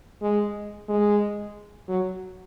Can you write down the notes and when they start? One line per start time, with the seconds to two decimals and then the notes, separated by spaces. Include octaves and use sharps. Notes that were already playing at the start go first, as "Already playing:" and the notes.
0.22 G#3
0.89 G#3
1.88 F#3